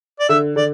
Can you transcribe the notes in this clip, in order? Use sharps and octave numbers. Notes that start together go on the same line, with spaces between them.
D5
D3 E5
D3 D5